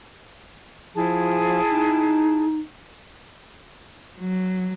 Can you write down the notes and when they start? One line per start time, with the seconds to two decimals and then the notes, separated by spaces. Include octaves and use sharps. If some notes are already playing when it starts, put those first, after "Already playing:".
0.95 F3 E4 G#4 A5
1.70 D#4
4.19 F#3